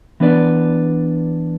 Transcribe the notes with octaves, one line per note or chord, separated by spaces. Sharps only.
E3 B3 D4 B4 D5